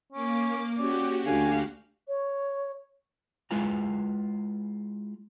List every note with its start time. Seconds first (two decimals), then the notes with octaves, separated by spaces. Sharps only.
0.12 A#3 C#4 D6
0.78 C#4 F#4 G4 D5
1.26 D2 D3 F5 G#5
2.07 C#5
3.51 G#3 E4 F4 B4 G#5 A#5